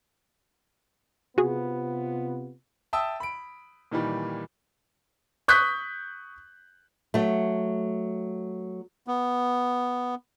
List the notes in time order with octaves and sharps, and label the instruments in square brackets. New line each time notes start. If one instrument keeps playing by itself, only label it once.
[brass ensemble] C3 B3 F4 [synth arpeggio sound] F#4 G#4
[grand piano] E5 G5 A5 D#6 E6
B5 D7
A#2 D#3 E3 G3
C#6 D#6 F#6 G6 B6
[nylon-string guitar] F#3 A3
[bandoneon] B3